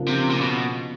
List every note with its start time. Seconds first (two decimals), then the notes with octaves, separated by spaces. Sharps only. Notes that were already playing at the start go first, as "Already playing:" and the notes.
Already playing: C#3 F3 A#3 D4
0.08 C3
0.30 A#2
0.42 B2